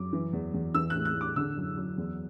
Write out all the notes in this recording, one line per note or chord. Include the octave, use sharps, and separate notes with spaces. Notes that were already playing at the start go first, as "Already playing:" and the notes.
Already playing: F#2 D6
E3
E2
E2
E3 E6
F#6
A2
F#6
A2
D6
D3 E6
F#2
F#2
E2